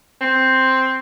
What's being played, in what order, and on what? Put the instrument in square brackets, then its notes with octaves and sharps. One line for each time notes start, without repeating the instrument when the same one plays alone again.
[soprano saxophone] C4